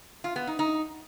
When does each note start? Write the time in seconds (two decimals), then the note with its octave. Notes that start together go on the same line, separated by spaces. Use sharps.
0.24 F4
0.36 B3
0.47 D#4
0.59 D#4